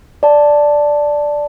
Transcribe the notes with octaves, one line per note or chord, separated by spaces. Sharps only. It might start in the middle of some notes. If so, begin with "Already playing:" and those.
D5 A5